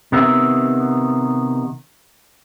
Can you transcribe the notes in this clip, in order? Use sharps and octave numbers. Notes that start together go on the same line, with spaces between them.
C3 D#3 B3 D#4 E5